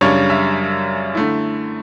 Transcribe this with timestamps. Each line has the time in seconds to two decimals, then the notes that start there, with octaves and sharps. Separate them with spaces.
0.01 F#2 C#3 G3 D4 C#5
0.30 E5
1.15 D3 A3 E4